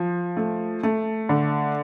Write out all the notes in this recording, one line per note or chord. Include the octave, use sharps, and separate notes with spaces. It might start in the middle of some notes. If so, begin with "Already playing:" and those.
Already playing: F3
A3
A3
D3